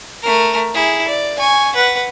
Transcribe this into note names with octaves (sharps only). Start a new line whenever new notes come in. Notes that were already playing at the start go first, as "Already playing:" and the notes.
A3 A#4
E4 G#4
D5
G#5 C#6
B4 F#5